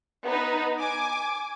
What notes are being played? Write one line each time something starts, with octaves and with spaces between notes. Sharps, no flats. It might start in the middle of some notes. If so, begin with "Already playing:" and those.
B3 D#4 B4
G#5 D6